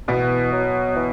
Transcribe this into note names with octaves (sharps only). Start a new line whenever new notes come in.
B2 E3 B3
F#3
E3